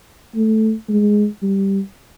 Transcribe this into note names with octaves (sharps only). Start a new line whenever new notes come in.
A3
G#3
G3